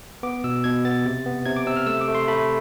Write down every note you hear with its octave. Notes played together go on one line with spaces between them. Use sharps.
B3 D6
B2 E6
B2 G#6
B3 A6
C3
B3
C3 G#6
D6
C3 E6
F6
A3 E6
D6
A3
C6
A3 B5